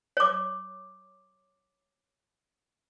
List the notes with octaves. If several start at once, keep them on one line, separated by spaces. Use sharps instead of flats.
C#5 D6